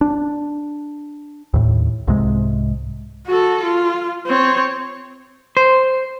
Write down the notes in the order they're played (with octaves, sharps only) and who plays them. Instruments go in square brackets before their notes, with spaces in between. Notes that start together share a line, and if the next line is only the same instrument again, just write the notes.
[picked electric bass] D4
D#2 A2
C2 G#2 C3 G#3
[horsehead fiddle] F#4 A4
F4
C4 C#5
[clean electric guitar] C5